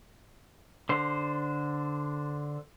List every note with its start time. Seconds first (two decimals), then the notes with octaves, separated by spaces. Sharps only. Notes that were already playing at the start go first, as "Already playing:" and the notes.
0.89 D3 C5